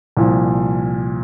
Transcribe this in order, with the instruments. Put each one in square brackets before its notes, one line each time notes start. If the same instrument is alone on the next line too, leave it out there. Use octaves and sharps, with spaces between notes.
[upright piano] C2 A#2 F3